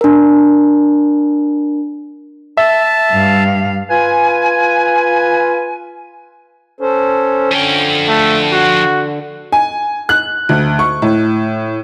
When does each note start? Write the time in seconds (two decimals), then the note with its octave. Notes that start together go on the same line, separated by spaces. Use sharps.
0.01 D4 A#4
2.57 E5 A5
3.12 G2 F5
3.89 F4 B4 G#5
6.80 C#4 A4 C5
7.51 D3 F3 G5
8.08 A3
8.52 F#4
9.52 G#5
10.09 F#6
10.49 D2
10.79 C#6
11.02 A2